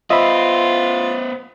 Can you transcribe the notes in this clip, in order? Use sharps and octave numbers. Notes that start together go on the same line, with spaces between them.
B3 F4 C5 D#5 E5 B5